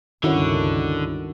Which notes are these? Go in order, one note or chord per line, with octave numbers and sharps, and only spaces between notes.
C#2 G2 D3 D#3 C#4 E4 F#4